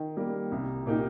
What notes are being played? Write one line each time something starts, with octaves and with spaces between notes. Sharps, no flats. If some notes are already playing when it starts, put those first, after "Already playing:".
Already playing: D#3
G3 A#3
C2
A#2 A#3 D#4 G4